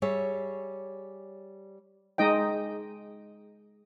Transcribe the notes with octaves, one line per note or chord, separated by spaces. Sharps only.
G3 G#4 C#5 E5
G#3 D#4 D#5 G5